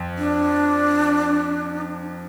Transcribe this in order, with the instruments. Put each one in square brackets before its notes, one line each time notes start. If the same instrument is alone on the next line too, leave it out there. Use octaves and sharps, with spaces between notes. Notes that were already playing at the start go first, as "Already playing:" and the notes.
Already playing: [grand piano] F2
[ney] D4